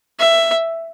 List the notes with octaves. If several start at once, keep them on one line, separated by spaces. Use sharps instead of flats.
E5